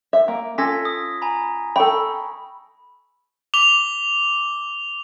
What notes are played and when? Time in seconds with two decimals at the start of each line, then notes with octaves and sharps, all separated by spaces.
0.13 E5
0.28 A#3
0.58 C#4 F4 A4 G#6 A#6 B6
0.85 D#6
1.22 G#5 A#5 B5
1.76 A4 G5 B5 C#6
3.54 D6 F7 G7